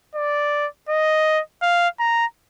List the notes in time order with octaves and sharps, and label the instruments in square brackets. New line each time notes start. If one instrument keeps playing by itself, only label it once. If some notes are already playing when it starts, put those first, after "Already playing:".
[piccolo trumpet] D5
D#5
F5
A#5